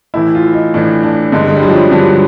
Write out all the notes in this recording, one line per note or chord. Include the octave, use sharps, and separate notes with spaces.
A2 E3 E4
F4
D#4
A2 E3 D4
D4
G2 D3 G#3
G#3
G3
F#3
F3
F#3
G2 D3